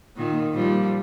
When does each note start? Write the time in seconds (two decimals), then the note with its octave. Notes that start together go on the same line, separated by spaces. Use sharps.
0.16 A#2 D#3
0.54 A#2 F3 G3